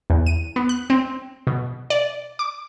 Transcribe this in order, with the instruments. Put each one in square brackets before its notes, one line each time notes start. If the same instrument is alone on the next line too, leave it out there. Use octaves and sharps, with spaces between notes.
[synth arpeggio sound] E2
D#7
B3
F#6
C4
B2
D5
D6